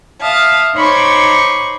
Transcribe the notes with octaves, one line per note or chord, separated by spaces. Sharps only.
E5 F5 A5 D#6
D#4 C5 C#5 B5 C#6 D6